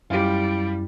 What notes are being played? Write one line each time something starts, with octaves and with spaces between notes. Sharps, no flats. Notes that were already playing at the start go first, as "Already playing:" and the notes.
F#2 G3 E4 F4 G4